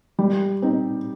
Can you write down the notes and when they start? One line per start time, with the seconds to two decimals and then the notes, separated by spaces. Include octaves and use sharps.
0.19 G3
0.62 C4 D#4